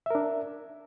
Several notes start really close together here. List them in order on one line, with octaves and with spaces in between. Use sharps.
E5 A#4 D4